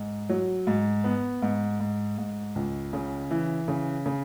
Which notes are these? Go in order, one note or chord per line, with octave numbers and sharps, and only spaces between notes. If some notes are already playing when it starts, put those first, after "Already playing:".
Already playing: G#2
F#3
G#2
B3
G#2
G#2
G#2
C#2
C#3
E3
C#3
C#3